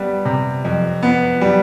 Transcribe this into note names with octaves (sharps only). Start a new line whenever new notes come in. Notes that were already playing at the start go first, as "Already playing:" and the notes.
Already playing: G3 B3
C3
F2
B3
G3